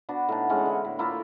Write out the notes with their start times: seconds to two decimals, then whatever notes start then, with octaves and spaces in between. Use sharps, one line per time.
0.09 B3 D4 F#4
0.29 A2 D#4 A5
0.49 E3 G#3 C#4
0.66 D3 E4
0.85 A2
0.99 A3 A#3 E4 F4